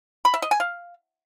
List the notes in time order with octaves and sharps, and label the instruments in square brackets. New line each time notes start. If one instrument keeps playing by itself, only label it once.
[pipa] B5
E5
D#5
G#5
F5